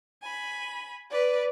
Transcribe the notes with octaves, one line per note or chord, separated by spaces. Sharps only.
G#5 B5
B4 D5